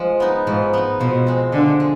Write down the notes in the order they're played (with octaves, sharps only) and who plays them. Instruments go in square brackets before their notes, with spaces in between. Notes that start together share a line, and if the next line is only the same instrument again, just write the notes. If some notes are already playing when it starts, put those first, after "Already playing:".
Already playing: [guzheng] F3 G#3
B3 D#4
[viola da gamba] G#2 [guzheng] F3
[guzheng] B3 D#4
[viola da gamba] B2 [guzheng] F3
[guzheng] G#3 C4
[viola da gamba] D3 [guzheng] F3
[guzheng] G#3